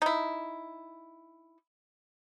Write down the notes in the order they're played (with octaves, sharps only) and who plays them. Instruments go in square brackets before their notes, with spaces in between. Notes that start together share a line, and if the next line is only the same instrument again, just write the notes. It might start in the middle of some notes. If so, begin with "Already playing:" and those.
[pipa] D#4 E4